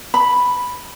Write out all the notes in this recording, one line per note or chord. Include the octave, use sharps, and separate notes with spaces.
B5